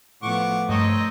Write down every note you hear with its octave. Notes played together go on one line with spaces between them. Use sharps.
A2 F3 B3 F#5 C#6 D6
G2 A3 C4 D#4 C#5 D#5